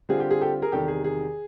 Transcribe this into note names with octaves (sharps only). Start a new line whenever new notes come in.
D3 G3 C4 F4 G#4
G4
G#4
G4 A4
G#4 A#4
E2 C3 D#3 G3 G4 A4
G#4
G#4